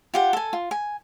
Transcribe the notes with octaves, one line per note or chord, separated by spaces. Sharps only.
F4 G4 F#5
A4 G#5
F4
G#5